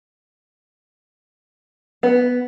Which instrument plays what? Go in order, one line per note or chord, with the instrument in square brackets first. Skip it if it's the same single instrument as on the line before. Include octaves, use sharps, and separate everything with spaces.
[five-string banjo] B3